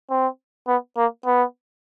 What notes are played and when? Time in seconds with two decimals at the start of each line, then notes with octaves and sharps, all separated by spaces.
0.10 C4
0.68 B3
0.97 A#3
1.26 B3